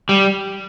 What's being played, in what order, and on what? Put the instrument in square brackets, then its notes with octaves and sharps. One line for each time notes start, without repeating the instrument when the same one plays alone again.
[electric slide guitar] G3